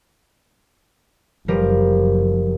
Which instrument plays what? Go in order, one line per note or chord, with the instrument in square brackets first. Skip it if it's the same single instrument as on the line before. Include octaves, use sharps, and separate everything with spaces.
[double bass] F#1 [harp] F3 G3 A#4